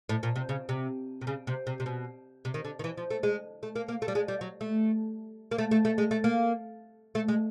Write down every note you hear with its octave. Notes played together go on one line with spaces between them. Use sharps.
A2
A#2
C3
C#3
C3
C3
C#3
C3
C3
C3
B2
C3
D#3
D3
D#3
E3
F3
A3
G#3
A3
A#3
A#3
A3
G3
G#3
G3
F#3
A3
A#3
A3
A3
A3
G#3
A3
A#3
A3
G#3